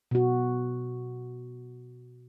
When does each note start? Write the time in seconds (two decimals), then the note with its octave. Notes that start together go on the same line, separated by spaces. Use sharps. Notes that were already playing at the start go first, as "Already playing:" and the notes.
0.11 B2 F#4